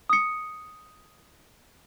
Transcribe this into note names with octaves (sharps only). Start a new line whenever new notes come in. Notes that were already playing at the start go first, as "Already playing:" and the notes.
D#6 C#7